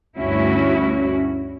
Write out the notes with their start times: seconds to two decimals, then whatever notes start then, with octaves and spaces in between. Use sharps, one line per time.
0.17 D2 G2 C#4 E4 F#4